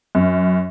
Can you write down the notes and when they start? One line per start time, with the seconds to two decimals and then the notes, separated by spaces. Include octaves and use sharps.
0.15 F#2